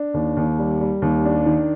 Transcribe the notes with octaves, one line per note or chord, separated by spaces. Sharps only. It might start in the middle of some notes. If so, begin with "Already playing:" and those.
Already playing: D4
D#2
D#2
G3
G3
D#2
D4
D#3